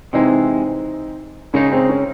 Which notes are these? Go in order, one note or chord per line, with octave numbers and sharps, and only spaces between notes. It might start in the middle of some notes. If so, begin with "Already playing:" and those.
C3 E3 G#3 C4 D#4
C#3 G#3 C#4 D#4
C4
C#4